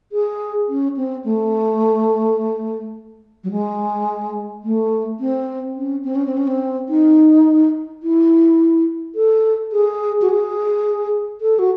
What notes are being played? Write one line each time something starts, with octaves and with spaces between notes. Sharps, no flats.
G#4
C#4
C4
A3
F#3
G#3
A3
C4
C#4
C4
C#4
C4
C#4
C4
D#4
E4
A4
G#4
F#4
G#4
A4
F#4